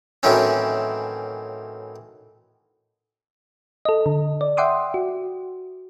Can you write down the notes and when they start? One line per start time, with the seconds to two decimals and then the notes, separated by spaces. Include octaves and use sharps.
0.23 A2 D#3 E3 F#3 C4 C#4
3.85 A4 D#5
4.06 D3
4.41 D5
4.57 E5 F#5 G5 C6 D6 D#6
4.94 F#4